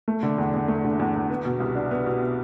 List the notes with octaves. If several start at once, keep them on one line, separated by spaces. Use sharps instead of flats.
A3
D3
E2
E2
A3
D3
E2
E2
B3
B2
C2
D4
B3
B2